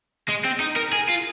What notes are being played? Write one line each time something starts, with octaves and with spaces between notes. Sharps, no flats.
G#3
C4
D#4
A#4
G#4
F4